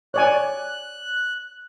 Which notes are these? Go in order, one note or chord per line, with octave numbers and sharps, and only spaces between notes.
C#5 D5 G#5 F#6